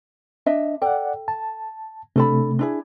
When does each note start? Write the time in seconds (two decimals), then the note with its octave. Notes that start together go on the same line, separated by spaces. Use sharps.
0.46 D4 D#5 E5
0.82 A4 D5 F#5 G5
1.28 A5
2.16 C3 A3 D4 A4 B5
2.59 D4 E4 G#4